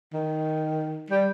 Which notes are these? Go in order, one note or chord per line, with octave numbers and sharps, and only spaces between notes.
D#3
G3